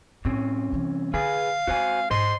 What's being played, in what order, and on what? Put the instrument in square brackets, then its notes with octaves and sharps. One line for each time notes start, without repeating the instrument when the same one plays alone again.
[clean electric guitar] C2 C4 C#4 [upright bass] A2
[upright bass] C3 E3
[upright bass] D3 [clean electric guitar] G#4 B4 G#5 [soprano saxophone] F5
[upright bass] G#3 C4 [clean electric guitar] F#4 C5 G#5
[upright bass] G#2 [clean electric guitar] C5 D#5 [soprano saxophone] C6